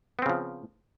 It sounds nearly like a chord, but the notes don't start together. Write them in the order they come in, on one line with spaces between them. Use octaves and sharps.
B3 C4 C#3 F3